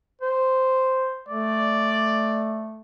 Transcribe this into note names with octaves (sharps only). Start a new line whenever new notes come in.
C5
A3 D5